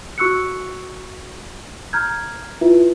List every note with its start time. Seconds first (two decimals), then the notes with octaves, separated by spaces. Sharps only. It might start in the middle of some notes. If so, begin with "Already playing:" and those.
0.18 F#4 C#6 E6 F#6 C#7
1.93 A#5 F6 G6 G#6
2.61 E4 F4 B4 E5